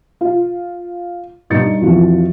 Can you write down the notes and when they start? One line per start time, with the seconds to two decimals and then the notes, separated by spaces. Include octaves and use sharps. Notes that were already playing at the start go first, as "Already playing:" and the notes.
0.21 F4
1.50 G2 D#4 A6 C#7
1.81 F2 E3 F4 F#4